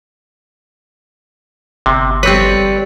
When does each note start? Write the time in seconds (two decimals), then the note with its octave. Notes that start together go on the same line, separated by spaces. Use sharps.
1.86 G1 C3
2.23 G3 C4 B4 C#5